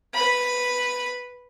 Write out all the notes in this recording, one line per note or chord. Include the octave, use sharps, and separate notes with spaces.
B4 B5